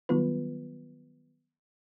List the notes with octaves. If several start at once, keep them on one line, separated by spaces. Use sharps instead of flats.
D#3 F#3 G3 B3 F4 B4